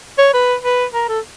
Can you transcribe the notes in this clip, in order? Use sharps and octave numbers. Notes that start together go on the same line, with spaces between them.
C#5
B4
B4
A#4
A4